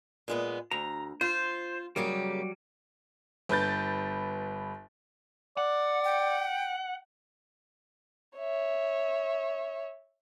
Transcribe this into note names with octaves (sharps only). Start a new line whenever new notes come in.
A#2 G#3 B3
D2 A#5
F4 C5
C#3 F#3 G3 A#3 G4
G1 B4 G6 A6
D5 F#5
G5
C#5 E5